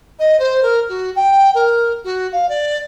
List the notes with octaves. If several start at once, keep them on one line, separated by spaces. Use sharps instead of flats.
D#5
C5
A#4
F#4
G5
A#4
F#4
F5
D5